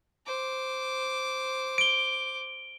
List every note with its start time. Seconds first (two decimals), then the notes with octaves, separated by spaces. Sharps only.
0.26 C5 D6
1.78 D7 G7